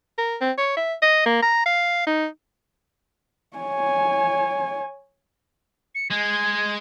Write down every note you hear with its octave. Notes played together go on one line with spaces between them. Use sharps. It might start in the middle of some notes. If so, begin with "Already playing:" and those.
A#4
C4
C#5
E5
D#5
A#3
A#5
F5
D#4
C#5 G#5
C#7
G#3 G#6